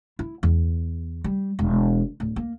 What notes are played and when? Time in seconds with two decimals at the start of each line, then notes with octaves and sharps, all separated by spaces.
0.19 E4
0.43 E2
1.24 G3
1.59 E1
2.20 D1
2.36 A#3